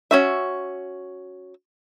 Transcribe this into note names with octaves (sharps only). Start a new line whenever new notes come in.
C#4 F#4 E5